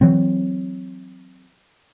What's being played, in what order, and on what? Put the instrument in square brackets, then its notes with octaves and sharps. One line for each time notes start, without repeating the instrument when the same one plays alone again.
[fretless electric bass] E3 F#3 C4